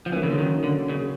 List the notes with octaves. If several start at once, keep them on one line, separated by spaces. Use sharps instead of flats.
F3
E3 F#3 A#3 C#4
C#3
D3
D#3
D3
C#3